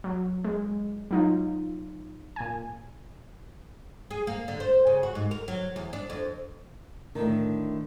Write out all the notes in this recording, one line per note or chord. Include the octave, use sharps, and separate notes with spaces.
F#3
G#3
F#3 D#4 F4
A#2 G#5
G#4
A#3
D3
C5
C#3
F#4
G#2
A#4
F#3
E2
D4
F2
A2 D3 D#3